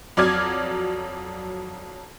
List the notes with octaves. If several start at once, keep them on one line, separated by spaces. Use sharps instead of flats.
F2 F#3 D5 D6 F6 G#6